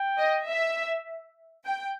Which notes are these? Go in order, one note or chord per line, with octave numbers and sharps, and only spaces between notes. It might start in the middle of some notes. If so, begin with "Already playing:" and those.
Already playing: G5
D#5
E5
G5